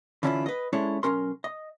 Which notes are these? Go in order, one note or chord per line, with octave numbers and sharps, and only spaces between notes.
D3 E3 C#4 D4 E4 F4
B4 D#5
G#3 C#4 D4 E4 A4 C#5
B1 A#2 C#4 A#4 C6
D#5